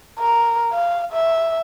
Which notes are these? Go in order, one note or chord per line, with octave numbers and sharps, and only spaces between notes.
A#4
F5
E5